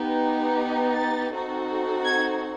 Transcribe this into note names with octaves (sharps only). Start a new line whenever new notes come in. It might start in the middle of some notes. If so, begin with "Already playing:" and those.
Already playing: B3 D#4 G4
A6
C4 D#4 F#4 A4
G#6